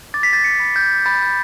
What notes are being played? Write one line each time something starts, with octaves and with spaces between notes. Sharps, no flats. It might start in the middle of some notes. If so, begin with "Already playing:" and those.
D6 A6
B6
A6
C#7
B5
G6
B5 A6